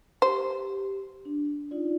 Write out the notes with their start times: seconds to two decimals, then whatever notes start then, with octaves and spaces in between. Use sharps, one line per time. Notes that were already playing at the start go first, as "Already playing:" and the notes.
0.22 G4 C5
1.25 D4
1.71 D#4 F4 D5